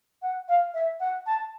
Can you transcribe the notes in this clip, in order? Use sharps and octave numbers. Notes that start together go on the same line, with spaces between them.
F#5
F5
E5
F#5
A5